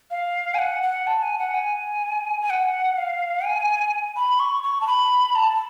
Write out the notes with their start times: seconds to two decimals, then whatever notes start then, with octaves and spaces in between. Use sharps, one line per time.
0.11 F5
0.54 G#5
0.59 F#5
0.83 F#5
1.07 A5
1.23 G#5
1.39 F#5
1.54 G#5
2.41 G#5
2.50 F#5
2.97 F5
3.45 G#5
4.16 B5
4.40 C#6
4.63 C#6
4.81 A5
4.87 B5
5.35 A5